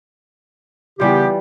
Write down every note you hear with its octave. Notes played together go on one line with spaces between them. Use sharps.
C#3 E3 G3 B3 F4 G4